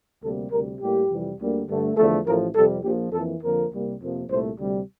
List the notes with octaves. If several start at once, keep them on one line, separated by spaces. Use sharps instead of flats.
D2 C3 G3 A#3 A4
D2 C3 G3 A#4
A2 G3 A#3 G4
F2 C3 E3 G3
D2 D3 G3 A#3
G2 D3 A3
E2 D3 F3 A3 A4
A1 A2 F3 A3 A#4
F2 C3 G3 A4
A#1 A#2 F3 G4
F2 E3 A#3 A4
F2 D3 F3 A#3 A#4
C2 C3 G3 A#3
F2 C3 F3 A#3
C2 A#2 A3 C5
D2 C3 G3